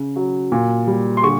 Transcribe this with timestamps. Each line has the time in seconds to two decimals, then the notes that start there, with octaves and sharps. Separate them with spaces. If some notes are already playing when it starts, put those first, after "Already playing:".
Already playing: C#3
0.16 F#3
0.52 A#2
0.87 G3
1.17 C6
1.23 D3 C#6